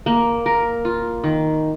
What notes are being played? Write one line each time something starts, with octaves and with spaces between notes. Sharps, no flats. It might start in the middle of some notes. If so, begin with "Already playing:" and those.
A#3
A#4
F4
D#3